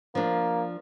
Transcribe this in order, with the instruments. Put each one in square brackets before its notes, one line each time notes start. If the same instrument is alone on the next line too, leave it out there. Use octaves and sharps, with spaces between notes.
[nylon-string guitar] F3 D4 [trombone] A#3